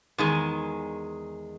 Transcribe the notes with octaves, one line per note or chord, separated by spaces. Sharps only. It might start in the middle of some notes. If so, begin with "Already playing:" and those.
E2 D#3 G#3